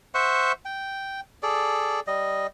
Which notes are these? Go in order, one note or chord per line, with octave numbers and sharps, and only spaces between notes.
C5 E5 F#5 C#6
G5
G#4 A4 D5
G3 D#5